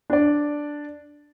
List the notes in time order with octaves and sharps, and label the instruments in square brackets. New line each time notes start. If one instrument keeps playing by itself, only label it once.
[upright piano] D4 D5